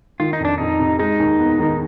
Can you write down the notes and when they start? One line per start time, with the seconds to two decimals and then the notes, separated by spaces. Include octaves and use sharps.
0.20 D#3 F4
0.33 D#4
0.40 F2 D4
0.58 F2 D#4
0.80 C3
0.99 G#3 D#4
1.19 D#2
1.39 B3
1.59 D#3